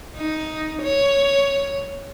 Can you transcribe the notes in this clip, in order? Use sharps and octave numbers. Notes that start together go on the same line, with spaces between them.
D#4
C#5